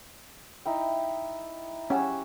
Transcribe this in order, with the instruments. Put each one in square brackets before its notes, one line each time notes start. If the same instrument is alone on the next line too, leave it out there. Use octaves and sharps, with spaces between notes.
[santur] D#4 E4 G5
[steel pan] C#4 [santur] G4 F#5 E6